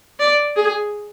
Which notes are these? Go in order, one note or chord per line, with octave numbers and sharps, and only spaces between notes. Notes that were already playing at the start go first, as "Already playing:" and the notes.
D5
G#4